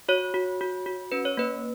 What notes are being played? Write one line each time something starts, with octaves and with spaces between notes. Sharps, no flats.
F#4 C#5
F#4
F#4
F#4
C#4 B4
C#5
A#3 B4